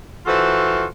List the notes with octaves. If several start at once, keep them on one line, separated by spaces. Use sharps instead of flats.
E3 F4 F#4 A4 C5